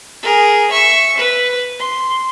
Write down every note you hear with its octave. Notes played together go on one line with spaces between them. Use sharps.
G#4 A#4
E5 C#6
B4
C6